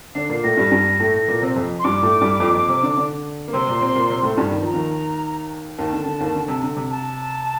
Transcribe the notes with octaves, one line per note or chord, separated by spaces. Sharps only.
D3 D4 C7
A#2 A#3
A2 A3 A#6
G2 G3
G2 G3
A2 A3
A#2 A#3
C3 C4
F2 F3
C6
G2 G3 D6
A2 A3
G2 G3
F2 F3
F2 F3
C3 C4
D3 D4
D3 D4
A#3
C3 C4 C6
A#2 A#3
C3 C4
A#2 A#3
C3 C4
A2 A3
G2 G3
D#3
F3 A#5
D#2 D#3
D#2 D#3 A5
D3
D3
D#2 D#3
D3
C3
D3
C3
A5